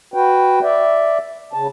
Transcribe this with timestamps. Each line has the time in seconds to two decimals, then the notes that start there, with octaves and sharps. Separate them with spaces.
0.14 F#4 B4 G5
0.63 D5 E5
1.53 C#3 A5